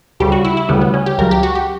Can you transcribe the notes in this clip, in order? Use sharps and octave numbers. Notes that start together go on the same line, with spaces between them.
D2 C#3 G3 G4
F#4
E4
E4
D2 C#3 G3 B3
B3
C#4
G4
C#2 C#3 F#3 A#4
G4
F#4
G4